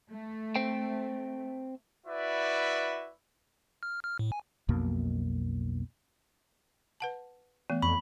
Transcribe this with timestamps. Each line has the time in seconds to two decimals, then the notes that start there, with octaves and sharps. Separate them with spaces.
0.10 A3
0.56 C4 C5 G5
2.07 E4 F#4 B4 D5 E5
3.83 F6
4.04 F6
4.19 A2
4.32 G#5
4.69 B1 F2 B2 A#3
7.00 B4 F#5 A5
7.70 E3 A3 B3
7.82 F2 B5 C#6